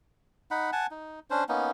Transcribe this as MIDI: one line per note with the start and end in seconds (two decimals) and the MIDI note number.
0.51 0.71 63
0.51 0.71 78
0.51 0.71 83
0.73 0.87 78
0.73 0.87 80
0.73 0.87 81
0.91 1.20 63
1.30 1.44 61
1.30 1.44 62
1.30 1.44 72
1.49 1.71 58
1.49 1.71 59
1.49 1.71 61
1.49 1.71 63